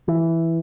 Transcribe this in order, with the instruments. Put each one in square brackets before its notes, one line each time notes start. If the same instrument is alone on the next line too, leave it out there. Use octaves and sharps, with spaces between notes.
[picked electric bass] E3